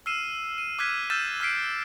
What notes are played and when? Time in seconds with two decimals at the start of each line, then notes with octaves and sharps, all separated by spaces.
0.06 E6 F6 C7 D#7 E7
0.58 D#7
0.79 D6 F6 F#6 G#6 B6 D#7
1.10 E6 F6 G6 A6 D#7 E7
1.40 E6 F6 B6 C7 D7